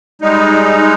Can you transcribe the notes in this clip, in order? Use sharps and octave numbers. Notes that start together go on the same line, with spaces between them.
G3 G#3 D#4